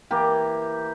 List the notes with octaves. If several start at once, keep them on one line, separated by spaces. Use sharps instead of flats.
E3 A#3 G4